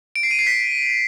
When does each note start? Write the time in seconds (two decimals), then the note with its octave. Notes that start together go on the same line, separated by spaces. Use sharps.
0.16 D7
0.23 C7
0.31 D#7
0.39 C7
0.47 B6